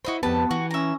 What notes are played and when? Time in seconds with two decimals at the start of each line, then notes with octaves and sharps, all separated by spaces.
0.05 E4 F#4 C5 D#5 B5
0.23 F2 B3 G4 B4 A5
0.51 E3 F#4
0.71 C#4 E5 A#5